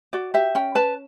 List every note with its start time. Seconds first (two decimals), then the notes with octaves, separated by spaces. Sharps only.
0.13 F#4 D5
0.34 G4 E5
0.55 C#4 G5
0.75 B4 A5